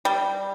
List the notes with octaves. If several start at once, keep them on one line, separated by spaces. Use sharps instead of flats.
G3